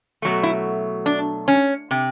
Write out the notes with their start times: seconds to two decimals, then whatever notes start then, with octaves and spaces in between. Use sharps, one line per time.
0.22 B2 F#3 A3
0.43 E4
1.06 D4
1.48 C#4
1.91 C3